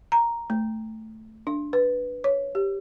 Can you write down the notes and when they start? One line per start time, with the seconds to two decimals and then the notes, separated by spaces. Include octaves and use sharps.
0.12 A#5
0.50 A3
1.47 D4
1.73 B4
2.24 C#5
2.55 G4